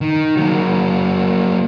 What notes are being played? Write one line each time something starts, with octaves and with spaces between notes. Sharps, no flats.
D#3
F#3 A#3